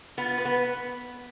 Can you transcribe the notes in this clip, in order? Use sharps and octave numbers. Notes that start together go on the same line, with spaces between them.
B3 F4
B4
B3